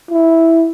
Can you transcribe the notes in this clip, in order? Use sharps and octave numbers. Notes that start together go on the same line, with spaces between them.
E4